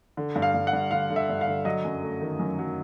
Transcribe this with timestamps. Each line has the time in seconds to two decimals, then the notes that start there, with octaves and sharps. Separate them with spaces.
0.17 D3
0.36 G2
0.42 F5
0.54 G2
0.67 F#5
0.73 G2
0.91 D3 F5
1.10 D3
1.16 E5
1.29 G2
1.41 F5
1.48 D3
1.65 F#3 D#5
1.85 F#2
2.02 A3
2.21 D#3
2.39 F#2
2.59 F#3